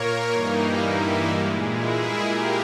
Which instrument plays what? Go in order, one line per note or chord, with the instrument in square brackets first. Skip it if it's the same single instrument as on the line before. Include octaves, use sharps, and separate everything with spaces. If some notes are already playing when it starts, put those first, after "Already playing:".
Already playing: [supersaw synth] A#2 A#3 A#4 C#5
G2 E3 G3 A#3 D#4
E4
A#2 G#3
E4 G#4
A#2 A#3 G4 A#4